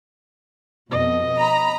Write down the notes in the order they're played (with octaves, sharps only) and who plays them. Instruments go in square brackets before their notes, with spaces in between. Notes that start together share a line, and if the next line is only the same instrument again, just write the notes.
[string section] F2 B2 [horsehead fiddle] D#5
[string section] A#5 B5